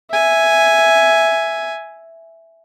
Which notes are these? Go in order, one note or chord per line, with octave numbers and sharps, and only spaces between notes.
E5 G#5